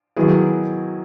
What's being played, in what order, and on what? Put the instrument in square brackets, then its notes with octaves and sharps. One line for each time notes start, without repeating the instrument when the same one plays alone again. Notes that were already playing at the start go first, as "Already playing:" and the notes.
[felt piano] D#3 F#3 B3 E4 G#4